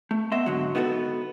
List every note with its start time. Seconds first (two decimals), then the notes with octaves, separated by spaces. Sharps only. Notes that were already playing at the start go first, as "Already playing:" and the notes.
0.11 A3
0.32 B3 D#5 E5 C6
0.46 G#2 D3 F#3
0.75 B3 D#4 F#4 G4 A4